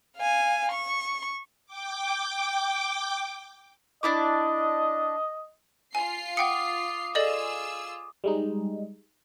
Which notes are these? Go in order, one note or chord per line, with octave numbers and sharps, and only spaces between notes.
F5 G#5
C#6
G5 D6
D4 E4 D#5 D6
F4 G#5 C7
F#5 G5 D6 D#6 C#7
F4 G#4 A4 D5 D#5 E6
G3 G#3 D#4